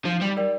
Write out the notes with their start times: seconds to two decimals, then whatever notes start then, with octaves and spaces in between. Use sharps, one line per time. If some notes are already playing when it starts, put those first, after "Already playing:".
0.06 F3 D#4
0.21 G3
0.37 G4 A#4 D5 G5